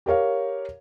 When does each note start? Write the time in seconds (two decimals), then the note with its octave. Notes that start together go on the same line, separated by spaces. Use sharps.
0.06 G4 A#4 C#5 F5